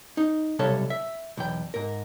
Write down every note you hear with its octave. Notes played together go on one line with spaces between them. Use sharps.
D#4
B1 C3 G3 A4 C#5 F5
E5
B1 E2 G5
G#2 A#4